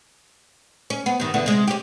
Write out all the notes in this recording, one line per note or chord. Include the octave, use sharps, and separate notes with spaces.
C#4
B3
G2 D#3
E2 D3 B3
C3 G#3
C#4 G4